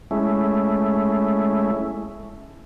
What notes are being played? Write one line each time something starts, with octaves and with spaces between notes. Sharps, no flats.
G#3 A3 C#4 E4